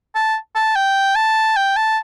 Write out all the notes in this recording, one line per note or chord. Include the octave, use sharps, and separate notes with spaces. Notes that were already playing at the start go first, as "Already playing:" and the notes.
A5
A5
G5
A5
G5
A5